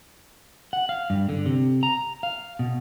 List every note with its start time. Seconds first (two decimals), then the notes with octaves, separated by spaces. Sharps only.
0.73 F#5
0.89 F5
1.10 G2
1.29 D3
1.46 C3
1.83 A#5
2.23 F5
2.59 B2